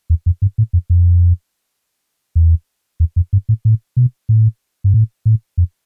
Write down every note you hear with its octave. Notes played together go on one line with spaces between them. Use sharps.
E2
F2
G2
A2
F2
F2
E2
E2
F2
G2
A2
A2
B2
A2
G2
A2
A2
F2